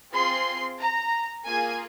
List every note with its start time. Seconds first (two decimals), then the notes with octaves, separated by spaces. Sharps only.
0.12 C4 F4 G#4 C6
0.79 A#5
1.46 A#3 F4 G#4 G#5